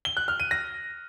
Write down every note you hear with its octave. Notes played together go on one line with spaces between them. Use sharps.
G7
F#6
F6
D#7
A#6